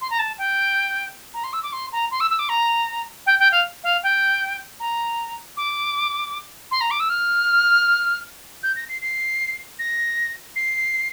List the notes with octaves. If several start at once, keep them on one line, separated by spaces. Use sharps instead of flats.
C6
A#5
A5
G5
A#5
C6
E6
D6
C6
A#5
C6
E6
E6
D6
A#5
G5
G5
F5
F5
G5
A#5
D6
C6
A#5
D6
E6
F6
G6
A#6
C7
C7
A#6
C7